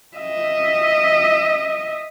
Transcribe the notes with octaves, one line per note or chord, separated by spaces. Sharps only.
D#5 E5